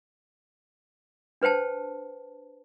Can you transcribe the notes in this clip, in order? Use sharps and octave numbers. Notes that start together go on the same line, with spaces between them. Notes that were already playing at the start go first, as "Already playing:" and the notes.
D4 B4 C5 G5 A5